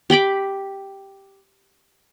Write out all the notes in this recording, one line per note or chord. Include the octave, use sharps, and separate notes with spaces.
G4 G5 B5 D6